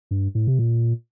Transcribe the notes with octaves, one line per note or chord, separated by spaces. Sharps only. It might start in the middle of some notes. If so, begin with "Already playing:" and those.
G2
A2
C3
A#2